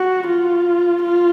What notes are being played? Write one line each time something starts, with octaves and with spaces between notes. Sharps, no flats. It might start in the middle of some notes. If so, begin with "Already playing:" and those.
Already playing: F#4
F4
F4